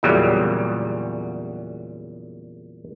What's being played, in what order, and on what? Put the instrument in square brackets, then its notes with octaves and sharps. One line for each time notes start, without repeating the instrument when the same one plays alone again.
[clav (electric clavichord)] E2 A#2 C#3 F#3 G3